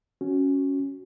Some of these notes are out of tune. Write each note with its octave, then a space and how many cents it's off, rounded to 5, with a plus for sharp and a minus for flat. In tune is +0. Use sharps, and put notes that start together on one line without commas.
C#4 +0 F#4 +0